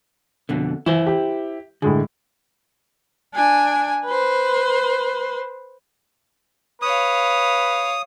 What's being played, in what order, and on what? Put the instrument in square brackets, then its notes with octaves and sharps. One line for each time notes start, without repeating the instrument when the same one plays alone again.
[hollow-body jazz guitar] F2 B2 D3
[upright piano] E3 [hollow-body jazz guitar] E4 C5
[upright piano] G4
[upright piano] A2 G#3 G#4 [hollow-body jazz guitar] D3
[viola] D4 G#5
B4 C5
[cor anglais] B4 [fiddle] C#5 F5 [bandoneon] D#6